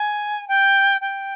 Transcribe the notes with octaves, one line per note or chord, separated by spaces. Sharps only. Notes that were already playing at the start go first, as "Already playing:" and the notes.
Already playing: G#5
G5
G5